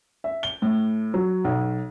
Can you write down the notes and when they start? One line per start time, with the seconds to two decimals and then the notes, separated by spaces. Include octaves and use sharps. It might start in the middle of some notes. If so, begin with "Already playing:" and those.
0.24 E5
0.43 G7
0.62 A2
1.14 F#3
1.44 B1